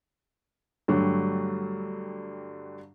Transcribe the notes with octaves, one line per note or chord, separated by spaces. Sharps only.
G2 D3 F#3 G3 A3